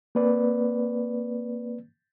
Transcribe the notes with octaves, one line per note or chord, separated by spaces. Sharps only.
A#3 C4 B4 D5